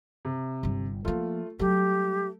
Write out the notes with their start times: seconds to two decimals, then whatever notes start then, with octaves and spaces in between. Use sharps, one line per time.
0.25 C3
0.63 G1 G3
1.05 F3 A3 A#3 F4
1.59 F#3 G3 A3 G4